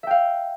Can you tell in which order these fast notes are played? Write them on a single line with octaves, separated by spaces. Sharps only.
E5 G5 F5